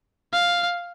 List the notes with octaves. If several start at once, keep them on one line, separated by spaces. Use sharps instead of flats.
F5